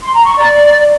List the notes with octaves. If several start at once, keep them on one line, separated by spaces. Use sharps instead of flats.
C6
A#5
C#6
D5